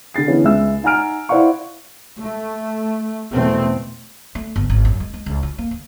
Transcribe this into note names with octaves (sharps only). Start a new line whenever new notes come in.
D3 G4 A6 C7
D3 E3 B3 C#4 G#4
C#2 G#3 E5 E6
D#4 F#5 G#5 A#5 F6 D7
E4 C5 D5 F5 F#5 C#6
A3
E2 B2 A3 C4
A3
G1
G#1
F#2
G#3
G#3
C#2
F4
A#3
D#2